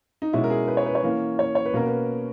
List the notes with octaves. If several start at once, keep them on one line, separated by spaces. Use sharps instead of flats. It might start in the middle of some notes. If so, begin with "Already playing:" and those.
D#4
B2 G#3 C#4 E4
A#4
G#4
B4
C#5
B4
C#5
E3 A#3 C#4
C#5
C#5
B4
B2 A#3 C#4 A#4
B4